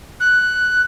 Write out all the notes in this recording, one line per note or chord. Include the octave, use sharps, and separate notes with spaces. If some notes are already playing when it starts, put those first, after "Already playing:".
F#6